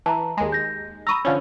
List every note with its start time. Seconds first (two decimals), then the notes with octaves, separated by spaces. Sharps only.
0.06 E3 A5 A#5
0.37 D#2 G#3
0.52 G6 A#6
1.07 A#5 B5 C#6 D#6 E6
1.25 D3 F3 C#4